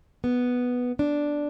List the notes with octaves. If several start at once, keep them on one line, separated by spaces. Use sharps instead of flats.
B3
D4